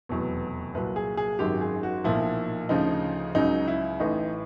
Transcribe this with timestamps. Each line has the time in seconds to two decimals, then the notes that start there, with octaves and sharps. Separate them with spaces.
0.09 F1 E2 B2 F#3
0.75 C2 A#2 F#3 B4
0.96 G#4
1.17 G#4
1.39 G#1 F#2 D#3 F#3 G4
1.61 G#4
1.83 F#4
2.04 B1 A#2 F3 E4
2.69 D2 C#3 F3 D#4
3.35 C#2 C#3 F#3 D#4
3.68 E4
4.00 A1 A2 E3 D#4